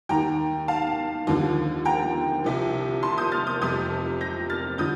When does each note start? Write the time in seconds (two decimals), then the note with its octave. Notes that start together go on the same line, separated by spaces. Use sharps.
0.09 D#2 D#3 G5 A#5
0.68 F5 A5
1.27 D#2 D3 F3
1.85 G5 A#5
2.44 C2 C3 F3
3.03 A5 C6
3.18 D#6 G6
3.32 F6 A6
3.47 D#6 G6
3.61 F1 F2 C3 F3 D#6 G6
4.21 G6 A#6
4.50 F6 A6
4.78 D3 F3 D#6 G6